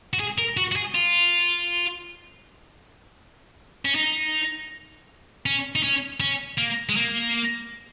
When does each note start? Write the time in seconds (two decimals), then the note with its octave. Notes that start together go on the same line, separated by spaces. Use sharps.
0.13 F#4
0.20 G#4
0.38 A#4
0.57 F#4
0.72 F#4
0.76 G#4
0.94 F4
3.85 C#4
3.95 D#4
5.46 C#4
5.76 D#4
5.83 C#4
6.21 C#4
6.58 A#3
6.89 G#3
6.96 A#3